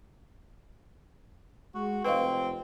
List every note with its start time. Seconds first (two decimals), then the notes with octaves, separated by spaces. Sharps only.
1.75 G#3 F#4
2.05 F1 C4 B4 D#5 F5